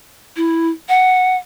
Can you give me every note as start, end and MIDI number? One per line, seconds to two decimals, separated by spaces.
0.36 0.69 64
0.89 1.37 78